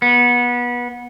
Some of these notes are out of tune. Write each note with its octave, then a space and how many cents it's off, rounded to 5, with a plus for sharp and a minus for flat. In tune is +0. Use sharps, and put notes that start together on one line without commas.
B3 -25